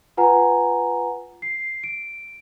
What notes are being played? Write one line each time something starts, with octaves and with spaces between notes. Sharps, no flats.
F4 B4 F#5 G#5 A#5
C7
D7